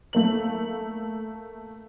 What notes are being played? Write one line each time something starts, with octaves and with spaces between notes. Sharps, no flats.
A3 A#3 F#7